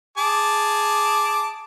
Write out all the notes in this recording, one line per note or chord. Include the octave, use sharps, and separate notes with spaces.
G#4 A5 D6